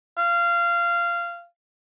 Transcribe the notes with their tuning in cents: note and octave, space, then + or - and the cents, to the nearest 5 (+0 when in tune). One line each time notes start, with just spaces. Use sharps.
F5 -20